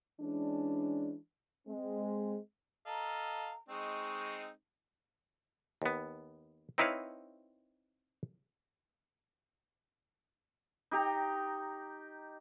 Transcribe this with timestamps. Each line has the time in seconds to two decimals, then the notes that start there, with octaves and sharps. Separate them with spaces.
0.21 E3 G#3 C#4 D4
1.68 G#3 C4
2.86 A4 D#5 F5 A#5
3.69 G#3 C4 D#4 C#6
5.82 D#2 B3
6.78 C4 D#4 E4 B4 C#5 F5
10.91 D#4 G4 A#5